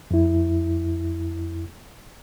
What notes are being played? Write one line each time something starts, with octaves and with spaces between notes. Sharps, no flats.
F2 E4